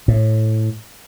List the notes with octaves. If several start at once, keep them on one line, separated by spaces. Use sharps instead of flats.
A2